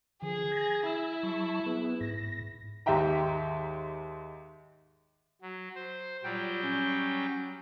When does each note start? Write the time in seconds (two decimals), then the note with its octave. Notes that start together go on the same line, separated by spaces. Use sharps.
0.22 D3 F3 G#4
0.52 G#6 A#6
0.86 E4 E6
1.23 F#3 A5 C#6
1.66 B3 G#4 B4
2.01 G#2 A#6
2.86 D#2 G#2 E5 G5 A#5
5.42 F#3
5.75 C5
6.23 A#2 F#3 G3 G5
6.63 C#4